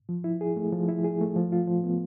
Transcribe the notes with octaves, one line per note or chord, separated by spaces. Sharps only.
F3
E4
G#4
A3
F3
E4
G#4
A3
F3
F4
F3
B3